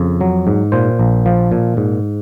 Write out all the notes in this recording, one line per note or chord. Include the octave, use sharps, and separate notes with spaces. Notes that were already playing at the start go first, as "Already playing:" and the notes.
Already playing: F2 C#3
F#3
G#2
A#2 C5
A#1
F3
A#2
G#2